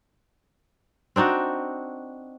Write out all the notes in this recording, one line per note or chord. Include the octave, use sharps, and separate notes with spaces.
C4 D4 D#4 F#4